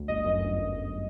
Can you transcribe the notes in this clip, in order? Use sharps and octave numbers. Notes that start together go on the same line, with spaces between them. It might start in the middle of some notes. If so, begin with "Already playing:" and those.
Already playing: D2
G1 D#5
F#2
G1
G1
G1